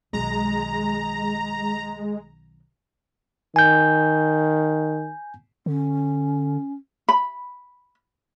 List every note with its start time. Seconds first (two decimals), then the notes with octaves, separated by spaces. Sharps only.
0.13 B1 D#3 G#3 A#5
3.56 D#3 G#5 G6
5.66 D3 C#4
7.09 B5